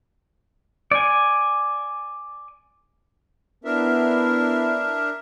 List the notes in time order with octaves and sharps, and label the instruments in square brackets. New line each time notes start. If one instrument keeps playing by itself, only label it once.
[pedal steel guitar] D5 G#5
[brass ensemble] B3 E4 [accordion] D4 A#4 E5